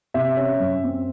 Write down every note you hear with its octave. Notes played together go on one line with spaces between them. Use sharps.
C3 E5
C#4
F#2
C4